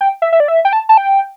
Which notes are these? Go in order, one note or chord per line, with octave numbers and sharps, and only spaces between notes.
G5
E5
E5
D5
E5
G5
A5
A5
G5